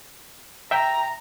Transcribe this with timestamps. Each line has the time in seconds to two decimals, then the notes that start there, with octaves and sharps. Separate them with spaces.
0.71 E5 G5 A#5